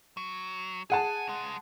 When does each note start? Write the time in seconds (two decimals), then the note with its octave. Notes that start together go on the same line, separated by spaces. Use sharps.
0.17 F#3
0.90 G#4 F#5 G#5 A5
1.27 C#2 G#3